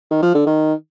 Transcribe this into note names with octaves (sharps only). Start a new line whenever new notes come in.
D#3
F3
D3
D#3